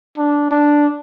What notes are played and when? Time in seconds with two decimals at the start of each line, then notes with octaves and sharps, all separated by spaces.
0.18 D4
0.51 D4